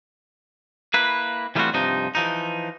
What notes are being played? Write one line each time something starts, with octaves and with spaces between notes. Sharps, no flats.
A#3 E4 B4
E3 G3 A3 C4 F4 F#4
G2 C3 F3 D#4
E3 F3 D#4